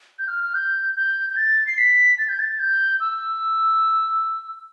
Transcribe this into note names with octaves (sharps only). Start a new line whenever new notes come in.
G6
F6
F6
G6
G6
G6
A6
C7
B6
A6
G6
A6
G6
E6